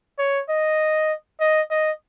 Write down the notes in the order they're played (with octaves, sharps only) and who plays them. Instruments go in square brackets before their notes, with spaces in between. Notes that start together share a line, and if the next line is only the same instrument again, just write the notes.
[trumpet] C#5
D#5
D#5
D#5